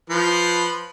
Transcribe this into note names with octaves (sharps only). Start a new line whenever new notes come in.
F3 B4